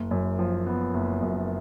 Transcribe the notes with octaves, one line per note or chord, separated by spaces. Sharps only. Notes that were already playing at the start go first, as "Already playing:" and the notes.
Already playing: F#1
F#2
F3
B3
F#1
F#2